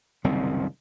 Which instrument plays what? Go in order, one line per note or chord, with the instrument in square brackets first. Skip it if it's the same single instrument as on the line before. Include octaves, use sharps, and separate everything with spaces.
[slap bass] F#1 C2 D#3 C4